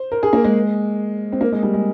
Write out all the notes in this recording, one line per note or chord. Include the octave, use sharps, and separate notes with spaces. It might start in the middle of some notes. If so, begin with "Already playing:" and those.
Already playing: C5
A#4
G#4
A#3
G#3
C4
A#3
G#3
G3
G#3